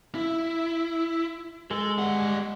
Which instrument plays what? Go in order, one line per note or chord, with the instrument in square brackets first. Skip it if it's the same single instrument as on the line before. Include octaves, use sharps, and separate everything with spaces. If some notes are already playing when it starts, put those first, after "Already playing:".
[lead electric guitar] E4
[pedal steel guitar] G#3 [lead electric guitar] A4
[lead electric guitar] G3 F#5